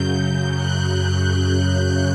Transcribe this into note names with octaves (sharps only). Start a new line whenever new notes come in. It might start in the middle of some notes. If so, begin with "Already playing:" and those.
Already playing: F#2 C#3 F#3 G6
G6
F#6
F#6
G6